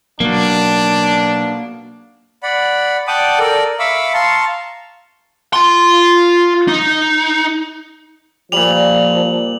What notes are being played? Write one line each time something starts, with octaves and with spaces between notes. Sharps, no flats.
B2 F#3 A#3 B3 D4 F#4
D5 F#5 B5
D5 F#5 G5 A5 D6 D#6
A4 A#4 D5
E5 F5 B5 C#6 D6 E6
F5 A5 A#5 C6 C#6
F4 C6
D#4
A#2 F3 G3 F7 F#7